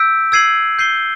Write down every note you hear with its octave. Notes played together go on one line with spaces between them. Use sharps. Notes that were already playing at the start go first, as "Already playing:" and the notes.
Already playing: E6 G6 B6 D7
E6 G#6 C7 D#7 F#7
G6 C7 D#7 G7